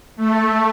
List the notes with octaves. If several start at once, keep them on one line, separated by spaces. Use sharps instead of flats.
A3